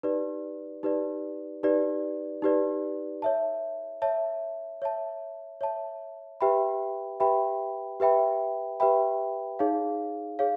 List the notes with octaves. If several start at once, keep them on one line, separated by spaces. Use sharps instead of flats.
D#4 G4 B4 D5
D#4 G4 B4 D5
D#4 G4 B4 D5
D#4 G4 B4 D5
C#5 E5 A5
C#5 E5 A5
C#5 E5 A5
C#5 E5 A5
G4 B4 E5 G5 B5
G4 B4 E5 G5 B5
G4 B4 E5 G5 B5
G4 B4 E5 G5 B5
D#4 G#4 C#5 F5
G#4 C#5 F5